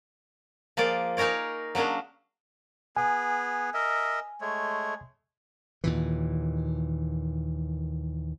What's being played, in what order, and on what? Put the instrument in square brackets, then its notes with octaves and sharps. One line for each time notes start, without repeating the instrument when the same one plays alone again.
[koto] F3 A#3 G#4 D5
D#4 G#4 A#4 C#5 D5
F#3 A#3 C#4 D4 G#4
[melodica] B3 G#4 [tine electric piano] G#5
[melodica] A#4 D#5 E5
G#3 A3 C#5
[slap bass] D#2 A#2 E3